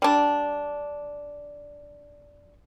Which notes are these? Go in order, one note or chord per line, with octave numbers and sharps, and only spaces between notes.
G3 D4